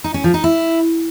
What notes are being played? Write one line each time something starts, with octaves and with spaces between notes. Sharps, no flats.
D#4
C#4
F3
D#4
E4